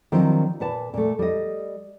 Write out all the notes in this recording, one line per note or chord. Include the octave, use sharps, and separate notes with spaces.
D#3 F3 F#3 C4 D4 E4
A#2 B4 A5
A#2 A3
G3 D#5